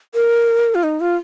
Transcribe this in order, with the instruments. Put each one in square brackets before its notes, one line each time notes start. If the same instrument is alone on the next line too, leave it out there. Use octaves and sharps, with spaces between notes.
[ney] A#4
F4
D#4
F4